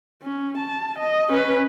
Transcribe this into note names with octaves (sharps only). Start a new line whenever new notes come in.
C#4
A5
D#5
C#4 B4